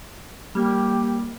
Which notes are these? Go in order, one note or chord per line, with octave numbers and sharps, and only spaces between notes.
G3 A#3 G4